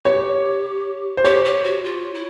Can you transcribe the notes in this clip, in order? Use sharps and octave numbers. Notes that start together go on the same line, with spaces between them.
G4 C#5
C5
G4 C#5
G4
F#4
F4
E4